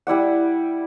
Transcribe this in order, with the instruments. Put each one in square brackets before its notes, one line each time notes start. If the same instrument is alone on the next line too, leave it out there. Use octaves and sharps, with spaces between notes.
[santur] G3 E4 D5 F#5